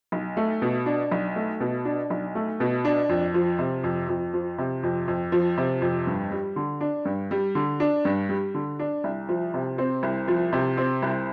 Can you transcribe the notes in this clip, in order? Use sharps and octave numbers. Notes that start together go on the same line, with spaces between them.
B1
A3
B2
D4
B1
A3
B2
D4
B1
A3
B2
D4
F2
F3
C3
F2
F2
F3
C3
F2
F2
F3
C3
F2
G2
G3
D3
D4
G2
G3
D3
D4
G2
G3
D3
D4
C2
F3
C3
C4
C2
F3
C3
C4
C2